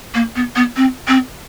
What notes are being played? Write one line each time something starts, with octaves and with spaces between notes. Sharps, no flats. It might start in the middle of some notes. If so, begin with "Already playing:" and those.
A#3
B3
B3
C4
C4